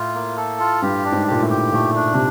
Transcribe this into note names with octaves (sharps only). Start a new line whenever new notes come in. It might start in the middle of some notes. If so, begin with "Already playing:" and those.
Already playing: A2 F4
A#3
A4
F4
G2 G4
D4
G#2
A#2 G4
A2
G4
A#2 A3
D4
C3